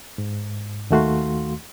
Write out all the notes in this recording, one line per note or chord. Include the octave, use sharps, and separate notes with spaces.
G#2
D#2 D#3 A3 F#4 F5 C6